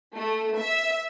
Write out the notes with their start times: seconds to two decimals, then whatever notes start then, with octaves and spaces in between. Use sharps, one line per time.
0.15 A3
0.56 E5